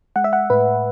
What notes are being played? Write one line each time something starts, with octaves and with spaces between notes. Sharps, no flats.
G#3 F#5
E5
F#5
A2 B4